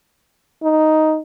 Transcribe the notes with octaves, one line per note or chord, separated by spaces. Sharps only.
D#4